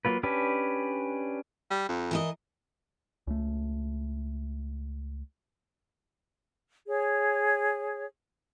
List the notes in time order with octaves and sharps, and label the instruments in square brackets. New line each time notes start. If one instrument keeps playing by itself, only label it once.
[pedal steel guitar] F#3 A#3 F4 B4
C#4 D4 G4 B4
[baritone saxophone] G3
F2
[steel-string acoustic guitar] E3 A#4 D#5
[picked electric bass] C#2 A3
[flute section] G#4 C#5